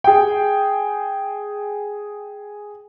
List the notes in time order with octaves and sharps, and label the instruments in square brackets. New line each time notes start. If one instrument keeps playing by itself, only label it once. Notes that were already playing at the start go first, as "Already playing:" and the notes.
[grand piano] G#4 G5